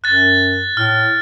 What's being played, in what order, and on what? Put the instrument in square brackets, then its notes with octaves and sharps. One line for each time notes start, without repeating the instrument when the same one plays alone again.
[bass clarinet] F#2 [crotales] F#6 A6
[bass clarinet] A2 [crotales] F6